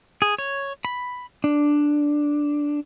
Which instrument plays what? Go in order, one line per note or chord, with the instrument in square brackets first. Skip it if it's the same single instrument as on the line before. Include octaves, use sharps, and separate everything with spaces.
[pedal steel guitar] G#4
C#5
B5
D4